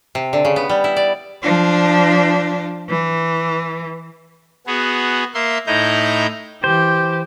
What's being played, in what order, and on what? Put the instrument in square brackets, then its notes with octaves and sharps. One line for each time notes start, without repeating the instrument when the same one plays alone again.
[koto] C3
D3
C#3
B3
G3
E4
D5
[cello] F3 D4
E3
[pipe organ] B3 F#4 G#4
A#3 E5 C6
A2 D#4 E4 D#5 A#5 G6
[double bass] E3 [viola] G4 [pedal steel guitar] C5